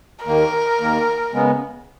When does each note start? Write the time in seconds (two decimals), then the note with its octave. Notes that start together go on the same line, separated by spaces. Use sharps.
0.24 D#2 D#3 A#3 A#4
0.79 D#2 D#3 A#3
1.33 C#3 G#3 B3